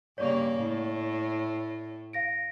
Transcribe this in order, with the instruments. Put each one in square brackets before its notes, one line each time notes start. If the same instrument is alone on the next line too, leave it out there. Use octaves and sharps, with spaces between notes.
[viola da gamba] G2 C#3 A#3 [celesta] C#5 D5 C#6
[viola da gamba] A2
[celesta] F5 A#6 D7